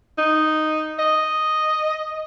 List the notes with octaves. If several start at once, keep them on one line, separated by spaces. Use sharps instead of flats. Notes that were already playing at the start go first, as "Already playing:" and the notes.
D#4
D#5